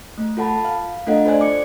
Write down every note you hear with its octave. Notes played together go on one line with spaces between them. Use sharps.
A3
F4 A4 F#5 A5 B5
F5
A3 D4 F4 A4 D#5 F#5
F4 A4 C5 D5 G#5 F#6
D6 C#7